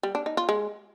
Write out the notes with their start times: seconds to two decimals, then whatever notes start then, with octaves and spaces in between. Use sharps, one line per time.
0.03 G3
0.15 D4
0.26 D#4
0.37 F4
0.49 G#3